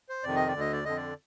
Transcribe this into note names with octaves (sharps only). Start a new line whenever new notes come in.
C5
F2 C3 D#3 D5
D#5
D5
D2 D3
D#5
D5
F2 D3 D#5
D5